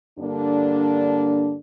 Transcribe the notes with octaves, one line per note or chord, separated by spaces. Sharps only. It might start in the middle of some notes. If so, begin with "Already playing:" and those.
G2 D3 A#3 D4